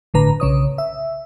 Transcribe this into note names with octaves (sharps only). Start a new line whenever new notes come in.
G1 A2 D3 B4 A#5
B1 C#3 C#5 D#6
E5